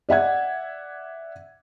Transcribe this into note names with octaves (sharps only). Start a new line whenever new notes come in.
D5 E5 F#5 G#6